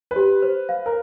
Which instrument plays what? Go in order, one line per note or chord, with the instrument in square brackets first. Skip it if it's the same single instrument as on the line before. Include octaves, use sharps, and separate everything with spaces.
[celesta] G4 [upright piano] B4
[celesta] C5
F5
[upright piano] A#4